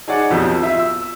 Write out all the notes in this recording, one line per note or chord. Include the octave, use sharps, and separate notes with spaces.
D#4 G#4 C#5 D5 F#5
B1 F2 B2 F3 G4 G6
F4 E5
E6